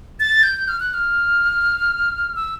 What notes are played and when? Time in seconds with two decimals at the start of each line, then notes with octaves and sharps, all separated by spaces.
0.20 A6
0.43 G6
0.68 F6
0.80 F#6
0.93 F6
2.36 E6